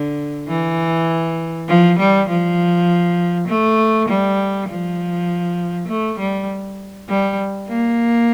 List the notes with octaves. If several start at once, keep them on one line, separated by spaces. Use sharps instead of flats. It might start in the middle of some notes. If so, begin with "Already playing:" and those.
Already playing: D3
E3
F3
G3
F3
A3
G3
F3
A3
G3
G3
A#3